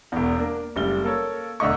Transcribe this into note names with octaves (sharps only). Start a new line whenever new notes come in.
E1 E2
A#3 D4
F#1 G3 A3 G7
A#3 A4 C#5
E1 D3 A3 D#5 C#6